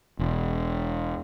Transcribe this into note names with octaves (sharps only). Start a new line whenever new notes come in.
E1